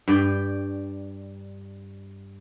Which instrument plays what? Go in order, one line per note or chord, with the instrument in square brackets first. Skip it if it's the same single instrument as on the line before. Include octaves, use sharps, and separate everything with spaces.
[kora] G2 D5 G5